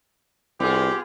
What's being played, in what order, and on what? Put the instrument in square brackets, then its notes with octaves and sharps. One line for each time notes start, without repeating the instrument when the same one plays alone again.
[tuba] C2 [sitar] B3 F4 G#4 [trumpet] G4